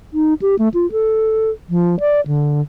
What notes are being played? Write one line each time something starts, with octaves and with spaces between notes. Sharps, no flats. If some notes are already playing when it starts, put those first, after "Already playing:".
D#4
G4
A3
F4
A4
F3
D5
D3